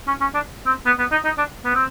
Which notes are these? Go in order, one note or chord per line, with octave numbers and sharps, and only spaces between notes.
C#4
C#4
D4
C4
B3
B3
D#4
D#4
D4
B3
C4